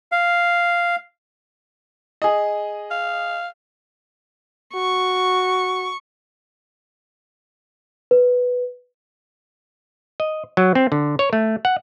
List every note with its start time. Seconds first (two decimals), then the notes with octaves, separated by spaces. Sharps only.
0.12 F5
2.22 G#4 D#5
2.91 F5
4.75 F#4 C#6
8.11 B4
10.20 D#5
10.57 F#3
10.75 C4
10.92 D3
11.19 C#5
11.33 A3
11.65 F#5